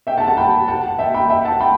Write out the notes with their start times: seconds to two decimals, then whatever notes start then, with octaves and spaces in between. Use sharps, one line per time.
0.07 E5 G5
0.17 F#5 A5
0.27 F#5 A5
0.37 G5 B5
0.68 F#5 A5
0.99 E5 G5
1.14 G5 B5
1.29 E5 G5
1.45 F#5 A5
1.60 G5 B5